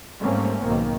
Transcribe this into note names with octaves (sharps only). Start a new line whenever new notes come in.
G#2 G3 A3 A#3 C4 C#4
B1 G#2 D#3 A#3